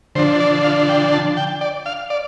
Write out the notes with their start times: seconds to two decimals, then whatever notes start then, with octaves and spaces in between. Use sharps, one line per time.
0.15 D3 F3 D4 C5
0.40 D5
0.64 F5
0.89 G5
1.13 A5
1.37 G5
1.61 D5
1.86 F5
2.10 D5